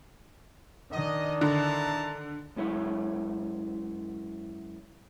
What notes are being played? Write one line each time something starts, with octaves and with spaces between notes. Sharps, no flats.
D#3 D4 D#5
D3 E4 A5 A#5
F#2 G#3 E4 C#5